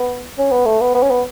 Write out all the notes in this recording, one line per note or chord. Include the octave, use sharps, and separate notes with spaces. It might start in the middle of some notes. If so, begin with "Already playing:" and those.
Already playing: B3
C#4
B3
A3
B3
B3
C#4
B3